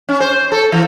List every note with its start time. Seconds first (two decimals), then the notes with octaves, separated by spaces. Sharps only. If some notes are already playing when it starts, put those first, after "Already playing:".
0.09 C#4
0.20 C5
0.52 A4
0.72 E3